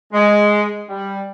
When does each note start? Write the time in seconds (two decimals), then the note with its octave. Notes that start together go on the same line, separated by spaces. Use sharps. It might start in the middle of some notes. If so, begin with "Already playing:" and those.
0.13 G#3
0.89 G3